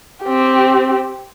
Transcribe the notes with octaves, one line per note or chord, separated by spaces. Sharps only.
C4 G4